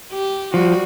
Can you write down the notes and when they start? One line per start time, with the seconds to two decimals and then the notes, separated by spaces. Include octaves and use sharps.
0.13 G4
0.54 F3 G3 F#4